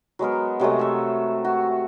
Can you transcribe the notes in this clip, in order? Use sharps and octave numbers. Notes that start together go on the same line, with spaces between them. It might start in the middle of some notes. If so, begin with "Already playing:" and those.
F#3 G#3 B3 A#4
C3 F#3 G#3 A3
A4 E5
F#4